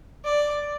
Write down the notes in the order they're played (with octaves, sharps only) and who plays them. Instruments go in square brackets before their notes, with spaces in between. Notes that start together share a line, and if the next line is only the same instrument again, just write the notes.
[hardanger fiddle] D5